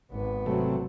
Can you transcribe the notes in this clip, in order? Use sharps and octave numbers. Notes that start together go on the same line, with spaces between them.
G#1 B3
C3 F#3 A3